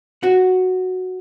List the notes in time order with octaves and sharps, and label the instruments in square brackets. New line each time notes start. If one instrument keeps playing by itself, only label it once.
[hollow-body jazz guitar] F#4 F#5